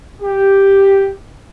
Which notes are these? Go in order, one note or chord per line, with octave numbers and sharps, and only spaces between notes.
G4